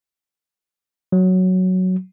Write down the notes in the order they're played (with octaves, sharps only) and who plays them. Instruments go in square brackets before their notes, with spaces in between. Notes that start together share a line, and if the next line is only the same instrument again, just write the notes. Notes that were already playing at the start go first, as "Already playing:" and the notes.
[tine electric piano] F#3